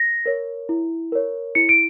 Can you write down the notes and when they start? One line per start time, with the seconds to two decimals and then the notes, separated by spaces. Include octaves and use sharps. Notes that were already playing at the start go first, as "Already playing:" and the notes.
Already playing: A#6
0.26 A#4 C#5
0.69 E4
1.12 A#4 C#5
1.55 E4 C#7
1.69 D7